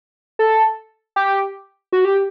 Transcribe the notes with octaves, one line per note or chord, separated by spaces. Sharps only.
A4
G4
F#4
G4